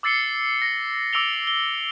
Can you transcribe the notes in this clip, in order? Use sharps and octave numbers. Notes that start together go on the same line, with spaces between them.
D6 E6 A6 C7 C#7 G7
A#6
D6 E6 D7 F7 G7
G7